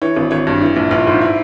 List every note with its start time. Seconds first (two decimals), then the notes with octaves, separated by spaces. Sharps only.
0.02 E3 C#5
0.17 G#1
0.31 G#1 C#5
0.47 G2
0.62 E3
0.76 A#1
0.91 A#1 F4
1.07 G#2
1.21 E4